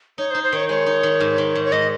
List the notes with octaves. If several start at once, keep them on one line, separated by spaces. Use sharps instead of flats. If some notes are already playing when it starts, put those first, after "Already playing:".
D#4 C#5
C5
D#4
C5
D#3 C#5
G#3 C#5
D#4
D#3
G#2
D#3
G#2
C#5
G#2 D#5